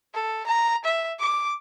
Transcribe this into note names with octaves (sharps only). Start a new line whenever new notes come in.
A4
A#5
E5
D6